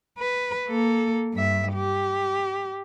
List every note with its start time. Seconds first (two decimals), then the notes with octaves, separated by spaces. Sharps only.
0.19 B4
0.68 A#3 A4
1.34 G2 E5
1.74 G4